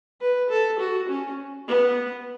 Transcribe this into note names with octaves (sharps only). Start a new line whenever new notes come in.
B4
A4
F#4
C#4
B3